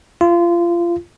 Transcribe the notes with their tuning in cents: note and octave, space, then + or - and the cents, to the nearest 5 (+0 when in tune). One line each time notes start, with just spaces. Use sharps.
F4 -25